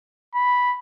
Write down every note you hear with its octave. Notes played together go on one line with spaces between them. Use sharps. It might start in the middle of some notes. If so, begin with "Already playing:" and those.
B5